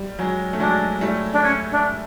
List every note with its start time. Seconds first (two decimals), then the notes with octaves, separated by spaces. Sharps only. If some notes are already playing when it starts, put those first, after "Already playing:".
Already playing: G3
0.19 F#3 G#3
0.53 A3
0.60 F#3 G#3 D4
1.01 G3 A3
1.33 D4
1.43 C#4
1.71 D4